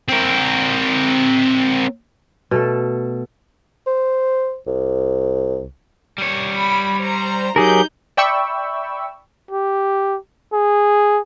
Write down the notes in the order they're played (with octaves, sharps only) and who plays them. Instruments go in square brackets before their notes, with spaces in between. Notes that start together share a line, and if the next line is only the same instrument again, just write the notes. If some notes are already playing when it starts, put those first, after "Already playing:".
[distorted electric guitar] C4 A#4
[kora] B2 A3 A4
[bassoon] C5
C2
[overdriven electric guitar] G3 C#5
[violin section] B5
C5 A#5
[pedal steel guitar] F#3 G#4 A#4 [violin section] D#4 G6 [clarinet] G4
[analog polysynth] D5 E5 G5 B5 C#6 E6
[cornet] G4
G#4